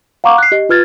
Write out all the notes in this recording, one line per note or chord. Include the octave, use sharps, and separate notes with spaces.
F5 F#5 A#5 C#6 D6
F#6 C7
G4 D#5
F4 B4 F6 G#6 A6